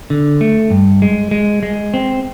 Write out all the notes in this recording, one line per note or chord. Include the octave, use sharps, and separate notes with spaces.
D3
A3
G2
G#3
G#3
G#3
C4